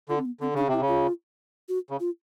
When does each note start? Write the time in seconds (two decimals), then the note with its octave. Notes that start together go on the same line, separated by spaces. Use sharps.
0.09 D3 F4
0.18 C4
0.25 B3
0.41 D3 C4
0.54 C#3 D4
0.68 C3
0.73 E4
0.81 C#3
0.88 F4
1.69 F#4
1.90 C#3
2.00 F4